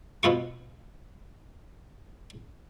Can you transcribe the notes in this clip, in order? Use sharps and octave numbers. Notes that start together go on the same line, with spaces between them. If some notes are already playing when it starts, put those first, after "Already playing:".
B2 B3 F4 C#6